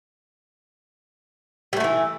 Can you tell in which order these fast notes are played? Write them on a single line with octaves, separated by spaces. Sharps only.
G3 A3 D3 E3